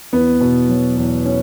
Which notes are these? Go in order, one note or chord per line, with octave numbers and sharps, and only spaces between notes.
E2 B3
B2
F#3
E2
C#4